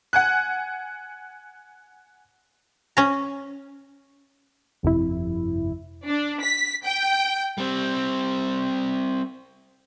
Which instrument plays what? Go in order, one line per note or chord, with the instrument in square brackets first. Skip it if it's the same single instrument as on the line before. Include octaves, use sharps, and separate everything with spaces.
[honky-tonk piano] F#5 G#5 F#6
[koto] C#4 A#5
[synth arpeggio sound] G1 F2 C3 E4
[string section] D4
B6
G5
[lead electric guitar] G3 C4